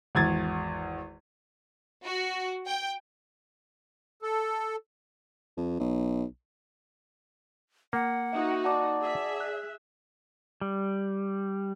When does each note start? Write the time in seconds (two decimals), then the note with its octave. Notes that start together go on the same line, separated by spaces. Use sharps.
0.15 G#1 E2 G#6 A6
2.04 F#4
2.67 G5
4.22 A4
5.57 F2
5.79 B1
7.93 A#3 F#5
8.33 D#4 F#4 E5
8.64 D5 F#5 A5 D6
9.01 G#4 E5
9.40 F#6
10.61 G3